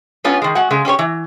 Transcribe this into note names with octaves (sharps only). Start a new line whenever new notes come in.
G3 B3 C#4 F4
D#3 G#3
G#3 F#4 F#5
C#3 G#3
C#4 G4 C5 C#5
E3